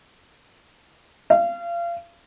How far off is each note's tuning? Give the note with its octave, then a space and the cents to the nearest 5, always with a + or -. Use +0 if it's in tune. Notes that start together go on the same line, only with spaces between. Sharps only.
F5 -30